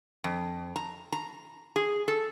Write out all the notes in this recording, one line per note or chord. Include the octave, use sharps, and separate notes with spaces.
F2
A#5
A#5
G#4
A4